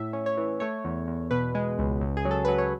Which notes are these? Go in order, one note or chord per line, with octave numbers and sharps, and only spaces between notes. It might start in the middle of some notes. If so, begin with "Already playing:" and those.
Already playing: A2 E5
C#4
C#5
E3
A3 C#5
E2
E2
B2 B4
G#3
C#2
C#2
G#4
F#3
A4
F#3 B4
C#5